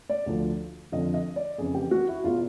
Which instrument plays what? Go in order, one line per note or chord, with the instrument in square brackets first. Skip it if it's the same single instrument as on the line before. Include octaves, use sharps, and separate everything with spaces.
[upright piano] D5
D2 D3 F3
F2 D3 F3 D#5
D#5
D5
F2 C#3 E3 G#4
G4
F#4
E4
E2 B2 F4